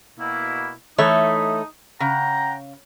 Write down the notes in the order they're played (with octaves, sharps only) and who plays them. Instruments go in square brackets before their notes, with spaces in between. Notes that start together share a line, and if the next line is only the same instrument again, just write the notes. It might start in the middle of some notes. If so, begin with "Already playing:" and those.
[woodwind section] B2 A#3 E4
[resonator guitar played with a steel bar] E3 A3 C#5 [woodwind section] D#4 D#6
[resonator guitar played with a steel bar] C#3 [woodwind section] F#5 G5 A#5